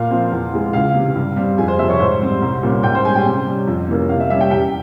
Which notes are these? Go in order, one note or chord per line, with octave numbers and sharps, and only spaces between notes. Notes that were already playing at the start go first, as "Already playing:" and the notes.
Already playing: A#2 F5
F3 C4
E2
E3 G#3
C#2 F5
C3 E3
G2
G3 C4
F2 G#4 G#5
C5 C6
C3 F3 E5 E6
C#5 C#6
G#2 C5 C6
G3 C4
C2
A#2 G3 C#4
G#2 G5 G6
C5 C6
G3 C#4 G#4 G#5
G4 G5
C3
G3 C#4
F2
C3 E3 A#3 C#4
C3 F5
E5
G3 C#4 E5
G4 G5
E2 G4 G5